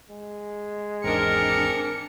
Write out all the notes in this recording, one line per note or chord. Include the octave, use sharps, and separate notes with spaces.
G#3
G#1 E2 C4 D4 G#4 A#4 C#7